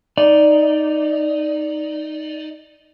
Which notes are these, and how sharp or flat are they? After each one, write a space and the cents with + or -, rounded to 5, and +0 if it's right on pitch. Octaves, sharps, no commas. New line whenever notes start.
D#4 +0 D5 +0